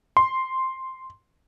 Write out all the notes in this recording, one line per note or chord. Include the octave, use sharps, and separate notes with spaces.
C6